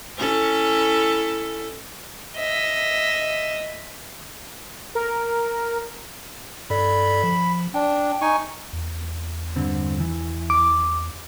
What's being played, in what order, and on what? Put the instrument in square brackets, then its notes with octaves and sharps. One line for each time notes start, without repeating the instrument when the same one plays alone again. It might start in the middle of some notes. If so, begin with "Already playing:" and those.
[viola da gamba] C#4 E4 A4
[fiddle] D#5 E5
[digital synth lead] A#4
[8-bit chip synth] G2 A4 D5 [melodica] B5
[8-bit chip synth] F3
[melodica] D4 [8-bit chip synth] G5
[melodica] D#4 G#5 C#6
[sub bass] E2
[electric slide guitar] G2 D3 C4
E3
[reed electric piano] D6